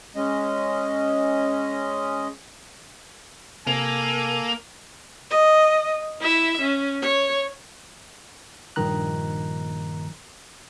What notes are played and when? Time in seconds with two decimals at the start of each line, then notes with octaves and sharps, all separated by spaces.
0.16 G#3 C#4 D#5
3.67 C3 A#3 A4 G#5
5.31 D#5
6.20 E4 E5
6.62 C#4
7.02 C#5
8.76 A#1 G2 D#3 A#5 F#6